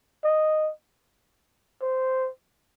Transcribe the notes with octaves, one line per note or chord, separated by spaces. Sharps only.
D#5
C5